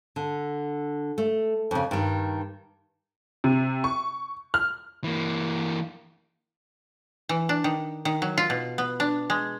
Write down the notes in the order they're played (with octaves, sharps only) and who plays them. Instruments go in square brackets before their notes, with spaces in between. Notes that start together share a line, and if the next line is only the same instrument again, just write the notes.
[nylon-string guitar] D3
A3
F2 C#3
G2 D#3
[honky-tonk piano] C3
C#6
F6
[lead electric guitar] E3 A#3
[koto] E3
D4
D#3
D#3
F#3
F4
B2
B3
D4
G#3